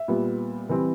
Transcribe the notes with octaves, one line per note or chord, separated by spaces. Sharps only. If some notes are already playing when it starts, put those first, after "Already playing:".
Already playing: E5
A#2 G3 B3
E3 G3 C4